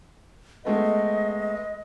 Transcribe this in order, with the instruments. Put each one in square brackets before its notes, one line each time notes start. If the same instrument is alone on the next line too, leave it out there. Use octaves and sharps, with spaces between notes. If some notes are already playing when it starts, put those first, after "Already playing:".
[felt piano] G#3 A3 B3 [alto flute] D#5